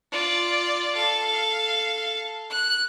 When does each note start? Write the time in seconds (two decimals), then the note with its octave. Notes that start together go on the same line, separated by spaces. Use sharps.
0.12 F4 D5
0.96 A4 F5
2.50 F#6